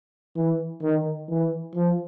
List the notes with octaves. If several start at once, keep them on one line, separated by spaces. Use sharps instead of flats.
E3
D#3
E3
F3